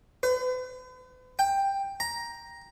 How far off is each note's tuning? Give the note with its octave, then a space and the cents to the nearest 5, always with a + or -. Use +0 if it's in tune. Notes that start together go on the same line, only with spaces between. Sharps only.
B4 +45
G5 +10
A#5 +10